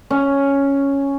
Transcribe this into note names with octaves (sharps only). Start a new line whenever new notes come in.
C#4